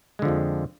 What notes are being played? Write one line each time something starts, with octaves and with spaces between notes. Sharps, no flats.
F2 D3 F3 G#3